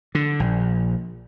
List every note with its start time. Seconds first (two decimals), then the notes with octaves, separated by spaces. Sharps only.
0.15 D3
0.40 A#1